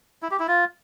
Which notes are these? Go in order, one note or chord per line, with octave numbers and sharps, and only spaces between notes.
E4
G4
E4
F4